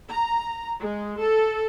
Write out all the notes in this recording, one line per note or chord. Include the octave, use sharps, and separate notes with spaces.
A#5
G#3
A4